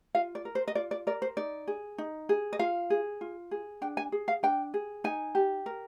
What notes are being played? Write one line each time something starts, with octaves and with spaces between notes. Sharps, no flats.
F4 F5
D5
A#4
C5
D#5
F4 D5
D5
A#4 D5
C5
D#4 D5
G#4
D#4
G#4
D#5
F4 F5
G#4
F4
G#4
D4 G5
G#5
G#4
F5
D4 G5
G#4
D#4 G#5
G4
A#4